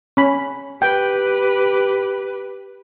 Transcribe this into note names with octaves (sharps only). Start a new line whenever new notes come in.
C#4 B5
G4 B4 G5